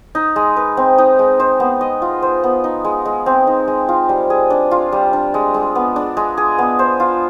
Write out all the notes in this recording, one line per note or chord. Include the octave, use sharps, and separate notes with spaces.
D#4
G#3
B4
C4
D#4
G#3
C5
B3
D#5
F4
C5
B3
D#4
G#3
G#3
C4
D#4
G#3
F4
G3
G#4
D4
F4
G3
D4
G#3
G#3
B3
D4
G#3
G#4
B3
C5
F4